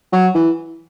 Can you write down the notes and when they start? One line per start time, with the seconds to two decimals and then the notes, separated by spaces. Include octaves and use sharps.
0.12 F#3
0.35 E3